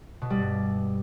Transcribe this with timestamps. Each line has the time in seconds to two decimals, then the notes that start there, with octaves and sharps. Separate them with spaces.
0.22 B2
0.30 G3
0.39 G2